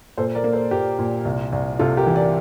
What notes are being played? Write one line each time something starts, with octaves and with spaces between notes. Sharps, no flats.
A#2 A4 C5
A#4 D5
A#3
A4 C5
A#2 G4 A#4
A#2
C2
C2
C3 F4 A4
G4 A#4
E3
A#4 D5